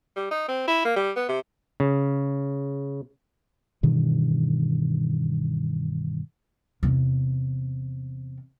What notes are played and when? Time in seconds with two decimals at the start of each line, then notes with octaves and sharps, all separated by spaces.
0.16 G3
0.31 D#4
0.48 C4
0.67 E4
0.85 A#3
0.96 G3
1.16 B3
1.29 C3
1.80 C#3
3.83 G2 B2 D#3 E3
6.83 E2 C3